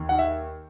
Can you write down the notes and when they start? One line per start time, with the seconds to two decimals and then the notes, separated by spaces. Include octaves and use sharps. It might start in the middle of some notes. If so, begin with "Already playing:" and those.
Already playing: D#2
0.09 D#3 F#5
0.19 E5